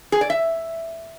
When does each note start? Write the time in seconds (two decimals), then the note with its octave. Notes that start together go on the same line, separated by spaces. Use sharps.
0.12 G#4
0.21 D5
0.30 E5